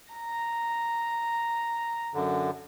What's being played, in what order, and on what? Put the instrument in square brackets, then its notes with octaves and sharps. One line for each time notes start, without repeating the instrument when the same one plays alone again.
[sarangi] A#5
[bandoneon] F#2 D3